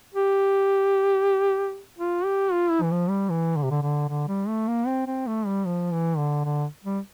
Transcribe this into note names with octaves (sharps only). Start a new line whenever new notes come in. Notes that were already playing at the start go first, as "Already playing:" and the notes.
G4
F4
G4
F4
E4
E3
F3
G3
E3
D3
C3
D3
D3
D3
G3
A3
A#3
C4
C4
A3
G3
F3
E3
D3
D3
G3